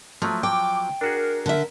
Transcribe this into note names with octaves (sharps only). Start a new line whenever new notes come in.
F3 F#3 A3
G5 D6
D4 F#4 G#4 A#4
D3 E5